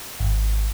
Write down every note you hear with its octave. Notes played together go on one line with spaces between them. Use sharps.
G#1